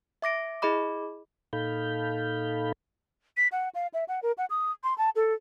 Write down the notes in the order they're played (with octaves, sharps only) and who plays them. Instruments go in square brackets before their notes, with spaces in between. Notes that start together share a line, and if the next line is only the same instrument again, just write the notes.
[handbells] E5 D6 A#6 D7
E4 G#4 D#5 B5 D6
[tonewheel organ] A#2 D#4 A4 F5 B5 G6
[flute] B6
F#5
F5
E5
F#5
A#4
F#5
D#6
C6
A5
A4